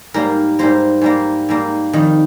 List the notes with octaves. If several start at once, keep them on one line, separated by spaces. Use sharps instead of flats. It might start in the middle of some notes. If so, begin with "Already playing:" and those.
G#2 G3 A#3 A#4
G#2 G3 A#3 C5
G#2 G3 A#3
G#2 G3 A#3
F2 D#3 G3